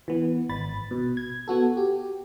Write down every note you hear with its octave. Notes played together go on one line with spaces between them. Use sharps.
E3 B3
G#1 B5 A6
B2
G#6
B3 F#4 A4
G4